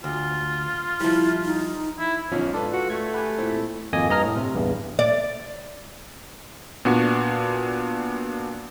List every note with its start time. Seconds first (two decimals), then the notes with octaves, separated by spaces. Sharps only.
0.04 D2 F4
1.00 F3 G3 E4
1.44 D#4
1.99 E4
2.32 B1 D#3 F3 C#4
2.52 G#2 D4 F4 A4 B4
2.73 F#4
2.90 A3 G#6
3.14 G4 F#5 G#5 B5
3.38 A#2 C4 E4
3.93 G#1 F2 A#3 D#5 G#5 D#6
4.09 G2 D#5 A#5 F6
4.22 A2
4.36 C3
4.54 A1 E2 G2
4.99 D5
6.85 A#2 B3 D4 F#4